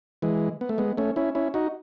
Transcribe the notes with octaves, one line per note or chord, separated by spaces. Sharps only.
E3 G#3
B3
A3
G#3 B3
A3 C#4
C#4 E4
C#4 E4
D#4 F#4